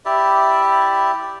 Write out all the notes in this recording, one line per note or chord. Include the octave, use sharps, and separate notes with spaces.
E4 G4 D5 E5